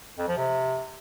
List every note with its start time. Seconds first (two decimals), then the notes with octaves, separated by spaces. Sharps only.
0.19 F2
0.28 F3
0.38 C3